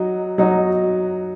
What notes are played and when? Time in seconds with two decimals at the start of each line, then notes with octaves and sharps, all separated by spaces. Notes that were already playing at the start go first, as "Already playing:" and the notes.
Already playing: F#3 D#4 F#4
0.38 F#3 D#4 F#4